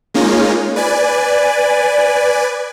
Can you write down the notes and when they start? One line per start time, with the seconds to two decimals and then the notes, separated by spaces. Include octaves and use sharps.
0.14 G#3 A#3 C#4 D#4 F4
0.76 B4 D5 G#5